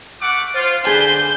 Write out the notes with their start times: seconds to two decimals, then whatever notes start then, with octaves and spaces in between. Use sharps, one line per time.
0.22 A3 F#5 D6
0.55 F4 C5
0.87 D3 D4 G#4 B4 C5 G6